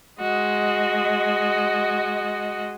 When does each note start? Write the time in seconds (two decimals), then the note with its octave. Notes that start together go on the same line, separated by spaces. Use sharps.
0.20 G#3 F#4 D#5